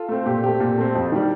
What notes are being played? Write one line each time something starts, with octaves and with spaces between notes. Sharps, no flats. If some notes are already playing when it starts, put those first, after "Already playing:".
Already playing: F4 A4
A3 C4
A#2 G4
A3 C4 G4
A#2
A3 C4
F2
D#3 G3